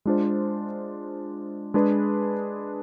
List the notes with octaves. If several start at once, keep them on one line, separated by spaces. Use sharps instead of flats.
G#3 D4 F4 C5
G#3 D4 G#4 B4